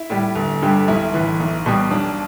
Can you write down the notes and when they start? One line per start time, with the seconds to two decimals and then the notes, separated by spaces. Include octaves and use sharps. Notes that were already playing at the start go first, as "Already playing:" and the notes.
Already playing: E4
0.10 A2 G3
0.35 G1
0.62 G2 D3 G3
0.88 B1 E4
1.14 A2 E3
1.40 B1
1.66 B2 G3
1.91 B1 D4